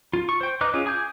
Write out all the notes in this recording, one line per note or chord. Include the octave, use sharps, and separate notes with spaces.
F4
C#6
C5 G5
D#4 B4 D#5 D6 F#6
C#4 F4 G#4
G#4 G#5 D6 G6